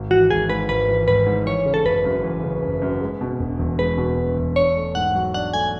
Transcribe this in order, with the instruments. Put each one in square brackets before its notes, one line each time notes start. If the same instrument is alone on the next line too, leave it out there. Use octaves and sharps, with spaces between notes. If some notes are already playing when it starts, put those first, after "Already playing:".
Already playing: [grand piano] G#1
[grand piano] E3 [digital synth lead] F#4
[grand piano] G#1 [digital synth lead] G#4
[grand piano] G#2 [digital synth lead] B4
[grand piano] G#1 [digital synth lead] B4
[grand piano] E3
[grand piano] G#1 [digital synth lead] B4
[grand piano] G#2
[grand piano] E3 [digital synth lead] C#5
[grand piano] C#3
[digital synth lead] A4
[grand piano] F#1 [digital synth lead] B4
[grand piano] F#2
E3
C#3
F#1
F#2
G#3
B2
E1
E2
[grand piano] G#3 [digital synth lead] B4
[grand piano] B2
E1
E2
[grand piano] D4 [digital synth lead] C#5
[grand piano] A3
[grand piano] G#2 [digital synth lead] F#5
[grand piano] F#3
[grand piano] D4 [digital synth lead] F#5
[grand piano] A3 [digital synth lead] G#5